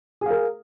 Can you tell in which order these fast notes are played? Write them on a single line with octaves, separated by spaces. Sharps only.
G#4 F5 A#4